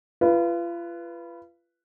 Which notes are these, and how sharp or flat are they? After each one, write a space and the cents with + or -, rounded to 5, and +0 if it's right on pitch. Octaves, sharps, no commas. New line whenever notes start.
F4 -35 B4 +0